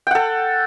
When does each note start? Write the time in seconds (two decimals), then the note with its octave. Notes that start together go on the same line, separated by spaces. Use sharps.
0.07 G5
0.11 F#5
0.15 A4